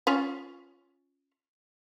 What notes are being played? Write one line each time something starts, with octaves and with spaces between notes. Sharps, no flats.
C#4 F4 C#5